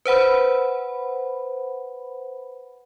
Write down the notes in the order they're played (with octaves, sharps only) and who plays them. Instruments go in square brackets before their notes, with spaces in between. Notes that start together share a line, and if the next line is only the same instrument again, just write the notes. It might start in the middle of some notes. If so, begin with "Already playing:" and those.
[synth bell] B4 C5 F#5 B5